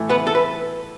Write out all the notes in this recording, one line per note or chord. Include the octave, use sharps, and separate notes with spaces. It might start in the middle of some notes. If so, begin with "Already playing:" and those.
Already playing: A2 E3 A3 E4
B3 B4
A4
B4